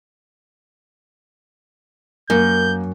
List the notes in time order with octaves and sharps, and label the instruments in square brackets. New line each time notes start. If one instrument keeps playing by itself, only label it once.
[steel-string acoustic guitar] F#2 [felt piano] A#3 [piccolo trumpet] G6